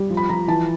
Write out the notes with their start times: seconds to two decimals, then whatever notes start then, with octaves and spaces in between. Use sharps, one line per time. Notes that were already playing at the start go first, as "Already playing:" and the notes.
Already playing: G3
0.10 F3
0.17 B5
0.29 F3 A#5
0.48 E3 A5